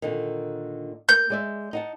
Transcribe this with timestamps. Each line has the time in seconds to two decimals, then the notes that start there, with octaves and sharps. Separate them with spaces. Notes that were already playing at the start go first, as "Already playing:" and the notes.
0.02 A#2 D3 D#3
1.09 A#3 G6
1.30 G#3 D5 E5
1.73 D#4 F#5 A5